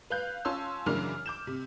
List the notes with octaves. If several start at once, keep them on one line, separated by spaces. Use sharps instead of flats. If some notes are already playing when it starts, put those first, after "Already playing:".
B4 F5 F#6 G6
C#4 F4 C#5 A5 C6 E6
F#2 C#3 E3 D4 A#4 F6
D6 G6 E7
C3